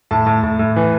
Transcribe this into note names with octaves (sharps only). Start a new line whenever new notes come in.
A2 A5
A2
A2
A2
E3